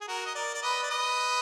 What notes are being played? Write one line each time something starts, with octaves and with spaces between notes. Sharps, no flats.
G#4
F#4 A#4
D#5
A#4 D5
D5
B4 D#5
D5
B4 D#5